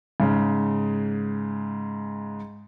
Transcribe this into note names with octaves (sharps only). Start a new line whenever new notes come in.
G#2 C#3